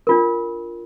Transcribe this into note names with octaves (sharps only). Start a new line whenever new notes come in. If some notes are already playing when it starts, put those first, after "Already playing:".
D4 F4 A#4